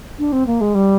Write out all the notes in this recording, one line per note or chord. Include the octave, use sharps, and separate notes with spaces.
D4
C4
A#3
G#3
G3